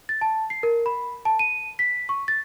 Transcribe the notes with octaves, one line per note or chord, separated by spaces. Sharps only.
A6
A5
C7
A#4
B5
A5
D#7
B6
C#6
A6